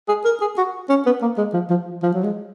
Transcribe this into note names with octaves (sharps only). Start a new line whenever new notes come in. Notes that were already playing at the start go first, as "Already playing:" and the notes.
G#4
A#4
G#4
F#4
C#4
B3
A#3
G#3
F3
F3
F3
F#3
G#3